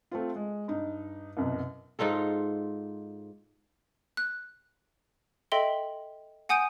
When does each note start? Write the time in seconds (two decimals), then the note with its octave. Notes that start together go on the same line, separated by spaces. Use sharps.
0.11 A3 C4 F4
0.36 G#3
0.68 G2 D#4
1.37 C2 F#2 B2
1.99 G#2 D#4 F4 A4
4.17 F#6
5.52 A4 D#5 E5 G5 C6 G7
6.49 F#5 G#5 D#6 G6 D7 D#7